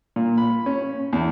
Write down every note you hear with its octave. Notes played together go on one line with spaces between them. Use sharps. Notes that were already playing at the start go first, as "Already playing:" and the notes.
A#2
B5
C#4
E2